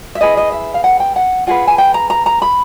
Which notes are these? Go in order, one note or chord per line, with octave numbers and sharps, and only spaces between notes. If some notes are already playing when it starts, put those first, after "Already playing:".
E5
E4 G#4 B4 D#5
D#5
E5
F5
F#5
G5
F#5
F4 G#4 B4 F#5
G#5
G5
A#5
A#5
A#5
B5